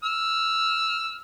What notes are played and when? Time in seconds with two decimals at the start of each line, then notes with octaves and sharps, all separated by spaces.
0.04 E6 F6